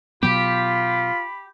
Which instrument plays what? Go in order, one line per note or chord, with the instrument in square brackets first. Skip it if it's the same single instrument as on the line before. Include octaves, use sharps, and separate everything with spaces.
[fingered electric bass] B2 F#3 B3 [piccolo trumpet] F4 [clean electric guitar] G4 [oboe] B5